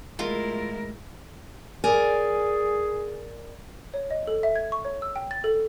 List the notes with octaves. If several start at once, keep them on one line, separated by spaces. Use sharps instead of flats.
A2 G#3 E4 F4 A#4
G#4 A#4 D5 G#5
C#5
D#5
A4
E5
G#6
C#6
C#5
E6
G5
A6
A4